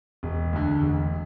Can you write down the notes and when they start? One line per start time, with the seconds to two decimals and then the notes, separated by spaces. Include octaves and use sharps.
0.23 E1
0.53 D2 D3
0.82 E1